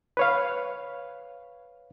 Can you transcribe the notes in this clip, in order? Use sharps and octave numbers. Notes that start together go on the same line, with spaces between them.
B4 C#5 F5